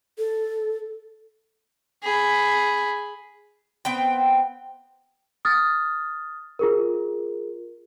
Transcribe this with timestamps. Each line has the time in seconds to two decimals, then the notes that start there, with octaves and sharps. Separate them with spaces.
0.18 A4
2.03 G#4 B5
3.85 B3 C4 G5
5.45 D#6 F6 A6
6.59 F4 G#4 A#4